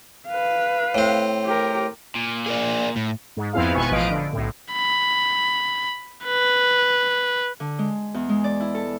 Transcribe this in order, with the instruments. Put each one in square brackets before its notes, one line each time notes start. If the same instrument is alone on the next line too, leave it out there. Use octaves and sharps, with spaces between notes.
[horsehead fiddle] B4 F5
[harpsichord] A2 C4
[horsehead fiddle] G4 A#4
[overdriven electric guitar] A#2
[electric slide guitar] G#4 A#4 D5
A2
[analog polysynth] G#2
F2 B3 C4 E4 G#4 F5
G#1 B2 B3 B4 G#5 C#6
A1 F3 B4 D#5 F5 D7
D3
B1 A2
[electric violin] B5
B4
[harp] D3
G#3
E2
G#3
D5
E4
A4